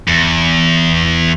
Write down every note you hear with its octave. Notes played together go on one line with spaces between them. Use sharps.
E2